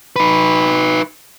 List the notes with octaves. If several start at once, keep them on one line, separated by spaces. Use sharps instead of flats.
D#4 B4